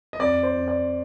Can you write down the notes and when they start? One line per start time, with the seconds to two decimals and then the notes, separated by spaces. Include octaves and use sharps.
0.13 D#5
0.19 F2 D5
0.43 C5
0.56 F2
0.68 D5